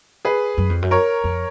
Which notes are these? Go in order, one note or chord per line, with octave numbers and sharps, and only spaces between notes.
G#4 B4
F#2
F2
F#2
A#4 C#5
F2